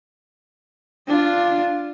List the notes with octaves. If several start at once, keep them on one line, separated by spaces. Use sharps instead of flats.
D4 F4